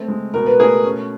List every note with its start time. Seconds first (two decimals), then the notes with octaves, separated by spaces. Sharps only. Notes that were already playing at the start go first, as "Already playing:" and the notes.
Already playing: A3 C4
0.08 G#3
0.34 B2 A#4
0.46 B4
0.59 A3 G#4 A#4
0.84 C#4